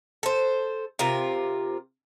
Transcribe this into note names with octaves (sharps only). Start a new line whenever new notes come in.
A4 C5
C3 F4 A#4